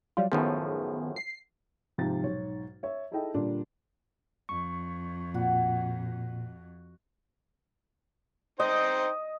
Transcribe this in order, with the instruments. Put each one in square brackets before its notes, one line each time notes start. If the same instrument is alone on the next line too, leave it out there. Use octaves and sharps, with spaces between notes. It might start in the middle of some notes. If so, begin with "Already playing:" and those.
[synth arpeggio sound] F#3 G3 F4
[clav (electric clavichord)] F#2 A2 F3 [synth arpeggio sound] D#3 B3 G#4
[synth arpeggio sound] C7
[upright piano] G#2 C3 F3 G4 A6
B1 G#2 C#5
C#5 E5
D#4 E4 G#4 A4 D#5 G5
A#2 D3 G3 D4 F4
[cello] F2 [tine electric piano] C#6
[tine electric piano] A#2 [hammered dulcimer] F#4
[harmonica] D#4 C5 G5 [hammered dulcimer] D#5